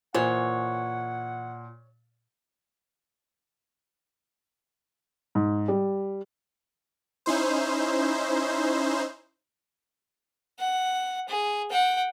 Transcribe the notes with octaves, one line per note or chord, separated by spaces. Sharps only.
A#2 E3 C5 C#5 F#5
G#2
G3
C#4 D#4 E4 C5
F#5
G#4
F#5 G5